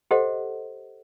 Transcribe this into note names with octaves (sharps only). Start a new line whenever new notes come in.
G4 A4 C5 D#5 F#5